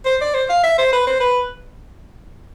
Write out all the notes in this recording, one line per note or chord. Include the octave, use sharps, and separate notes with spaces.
C5
D5
C5
F5
E5
C5
B4
C5
B4